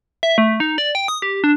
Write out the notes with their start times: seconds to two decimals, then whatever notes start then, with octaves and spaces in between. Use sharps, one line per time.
0.23 E5
0.38 A3
0.60 D#4
0.78 D5
0.95 G5
1.08 D#6
1.22 G4
1.44 D4